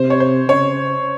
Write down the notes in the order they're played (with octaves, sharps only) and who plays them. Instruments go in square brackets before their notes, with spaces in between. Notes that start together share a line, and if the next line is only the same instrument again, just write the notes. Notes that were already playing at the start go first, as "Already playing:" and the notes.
Already playing: [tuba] C3 [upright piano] C5
[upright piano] C#5
C5
[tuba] C#3 [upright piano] C#5